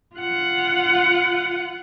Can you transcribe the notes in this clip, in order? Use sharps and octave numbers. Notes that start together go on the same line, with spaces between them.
F4 F#5